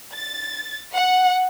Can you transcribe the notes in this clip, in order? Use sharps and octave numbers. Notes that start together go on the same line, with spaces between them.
A6
F#5